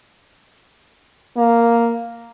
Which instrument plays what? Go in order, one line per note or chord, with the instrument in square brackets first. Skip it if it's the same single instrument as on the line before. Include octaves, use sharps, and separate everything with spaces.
[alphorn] A#3